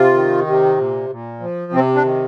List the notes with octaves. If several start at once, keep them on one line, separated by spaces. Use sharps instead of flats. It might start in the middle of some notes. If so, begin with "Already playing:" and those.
Already playing: C3 F4
D#3
C3
A#2
A#2
F3
C3 C4
D4
D#3